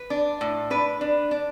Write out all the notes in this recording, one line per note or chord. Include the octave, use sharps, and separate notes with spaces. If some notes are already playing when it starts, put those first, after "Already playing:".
Already playing: B4
D4
A2
D4 B4
D4
D4